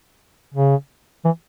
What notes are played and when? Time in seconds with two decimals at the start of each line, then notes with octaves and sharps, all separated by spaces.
0.54 C#3
1.25 E3